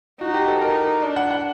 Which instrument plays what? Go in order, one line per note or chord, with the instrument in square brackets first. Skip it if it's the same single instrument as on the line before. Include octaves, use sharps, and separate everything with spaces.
[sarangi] D#4 [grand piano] F#4
[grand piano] G4
A4
[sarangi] D#4 [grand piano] A#4
[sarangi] D4
[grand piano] F#5
F#5